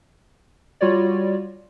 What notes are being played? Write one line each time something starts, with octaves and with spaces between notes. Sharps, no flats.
G3 F4 F#4 C#5 D5